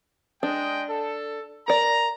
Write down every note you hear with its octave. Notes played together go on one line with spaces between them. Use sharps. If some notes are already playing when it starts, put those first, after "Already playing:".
G#3 D4 D#5 G5
A4
A#4 D5 A#5